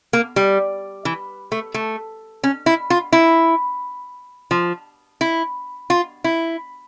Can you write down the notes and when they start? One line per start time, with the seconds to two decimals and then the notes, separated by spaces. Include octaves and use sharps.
0.13 A#3
0.36 G3
1.05 E3
1.52 A3
1.74 A3
2.43 C#4
2.66 E4
2.90 F4
3.12 E4
4.51 F3
5.21 E4
5.90 F4
6.24 E4